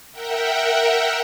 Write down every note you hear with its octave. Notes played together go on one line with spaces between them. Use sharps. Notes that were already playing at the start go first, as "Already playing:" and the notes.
A#4 E5 F#5 G5